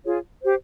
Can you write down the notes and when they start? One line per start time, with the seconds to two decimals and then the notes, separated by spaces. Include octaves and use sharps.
0.05 F4 G#4 C#5
0.41 G4 C5